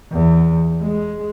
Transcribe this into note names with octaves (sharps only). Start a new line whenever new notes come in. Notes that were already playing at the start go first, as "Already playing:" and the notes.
E2
G#3